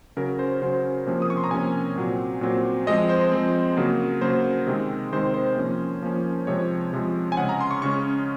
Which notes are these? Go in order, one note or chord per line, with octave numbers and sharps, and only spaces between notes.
C#3 F#3 C#4 A#4
C5
C#3 F#3 C#4 C5
C3 F3 A#3 C#4
D#6
C#6
C6
A#5
C3 F3 A#3 C#4 G#5
A#2 F#3 C4
A#2 F#3 C4
F3 G#3 C4 D#5
C5
F3 G#3 C4
C#3 F#3 A#3
C#3 F#3 A#3 C5
C3 D#3 G#3 C4
C3 D#3 G#3 C4 C5
C5
F3 A#3 C#4
F3 A#3 C#4
C3 F3 G#3 C#5
C3 F3 G#3
G#5
C#3 G#3 C#4 F#5
A#5
C6
C#6
C#3 G#3 C#4 C#6